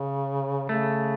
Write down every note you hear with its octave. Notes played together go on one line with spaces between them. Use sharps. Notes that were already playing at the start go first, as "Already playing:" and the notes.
Already playing: C#3
C#3 A3